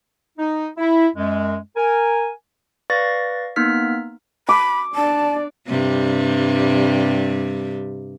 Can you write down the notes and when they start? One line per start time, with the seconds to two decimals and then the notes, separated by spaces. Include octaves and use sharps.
0.38 D#4
0.78 E4
1.16 F#2 G#3
1.76 A#4 G#5
2.90 B4 D5 F5 C#6 A6 A#6
3.56 A#3 B3 D#4 F6 B6
4.49 B5 D6
4.95 D4 D5 A5
5.68 G2 C3 G3